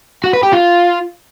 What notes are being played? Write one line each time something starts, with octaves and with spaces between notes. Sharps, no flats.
F#4
B4
G4
F4